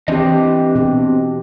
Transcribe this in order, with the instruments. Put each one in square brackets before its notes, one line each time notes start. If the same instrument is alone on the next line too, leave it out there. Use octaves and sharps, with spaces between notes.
[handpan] E3 G4 [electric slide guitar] C4 D4 D#5
[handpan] B2 G4